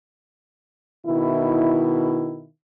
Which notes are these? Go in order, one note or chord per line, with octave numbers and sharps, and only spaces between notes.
B2 D#3 E4